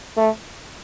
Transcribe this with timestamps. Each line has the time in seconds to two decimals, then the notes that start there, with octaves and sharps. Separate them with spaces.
0.17 A3